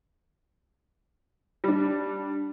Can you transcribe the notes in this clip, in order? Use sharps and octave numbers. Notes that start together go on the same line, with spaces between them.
G3 D4